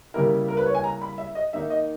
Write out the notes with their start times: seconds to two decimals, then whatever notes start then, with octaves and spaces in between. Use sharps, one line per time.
0.14 C#3 G3 A#3 E4 A#4
0.48 A#4
0.57 B4
0.66 C#5
0.75 G#5
0.84 A#5
1.02 B5
1.18 E5
1.35 D#5
1.53 D#3 A#3 D#4 E5
1.70 D#5